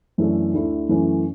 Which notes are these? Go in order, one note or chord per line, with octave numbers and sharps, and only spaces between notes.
F#2 E3 A3 D4 A4
D2 D3 A3 E4
F#2 E3 A3 C#4